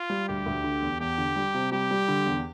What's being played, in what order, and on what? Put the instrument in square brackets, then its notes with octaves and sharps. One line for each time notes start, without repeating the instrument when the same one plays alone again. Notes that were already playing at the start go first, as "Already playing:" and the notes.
Already playing: [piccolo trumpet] F4
[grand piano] G3
[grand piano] D2 [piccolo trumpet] G4
[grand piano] D2
D3
E2
[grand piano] E2 [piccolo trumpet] G4
[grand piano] D3
G3
C3
[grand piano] G3 [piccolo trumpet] G4
[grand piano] G3
D3
E2